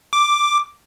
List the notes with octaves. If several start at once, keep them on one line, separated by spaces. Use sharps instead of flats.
D6